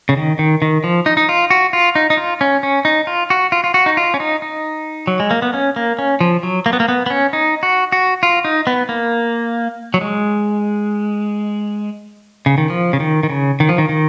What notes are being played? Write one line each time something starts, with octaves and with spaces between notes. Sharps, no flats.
C#3
D#3
D#3
D#3
F3
D#4
D#4
F4
F#4
F4
D#4
D#4
F4
C#4
C#4
D#4
F4
F#4
F4
F4
F#4
D#4
F4
C#4
D#4
D#4
F#3
G#3
A#3
B3
C#4
A#3
C#4
F3
F#3
A#3
B3
A#3
B3
B3
C#4
D#4
F#4
F#4
F4
D#4
B3
A#3
F#3
G#3
C#3
D#3
F3
C#3
D#3
D#3
C#3
D#3
F3
D#3
D#3